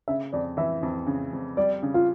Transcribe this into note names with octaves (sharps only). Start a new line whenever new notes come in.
C#3 E5
F2 D5
E3 E5
F2
C#3
F2
G3 D5
C#3
F4